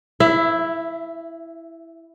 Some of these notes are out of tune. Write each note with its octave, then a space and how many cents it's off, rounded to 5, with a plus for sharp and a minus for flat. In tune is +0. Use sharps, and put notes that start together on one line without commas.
E4 +0 E5 +35